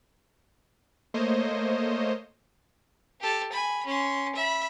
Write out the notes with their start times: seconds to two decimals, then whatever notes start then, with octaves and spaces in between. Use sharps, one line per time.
1.14 A3 A#3 C5 C#5 D#5
3.21 G4 A4
3.52 G#5 B5
3.85 C#4 C6
4.35 E5 B5